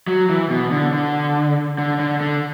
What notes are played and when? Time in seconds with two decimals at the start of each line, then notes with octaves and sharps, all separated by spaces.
0.07 F#3
0.29 E3
0.50 B2
0.71 D3
0.93 D3
1.78 D3
2.00 D3
2.21 D3